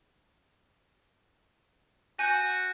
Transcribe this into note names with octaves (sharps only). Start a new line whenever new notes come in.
F#4 G#5 G6 C#7